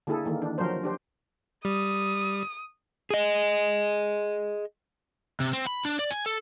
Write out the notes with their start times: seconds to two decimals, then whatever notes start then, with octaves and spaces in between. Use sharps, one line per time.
0.07 D3 A#3 E4 G#4 A4
0.25 D#3 E3 A#3
0.42 D4
0.58 F3 F#3 A#4 C5
0.84 D4 G4 C5
1.65 G3 D#6
3.10 G#4 D#5
5.40 C3
5.53 C4
5.67 B5
5.85 D4
5.99 D5
6.11 G#5
6.26 A4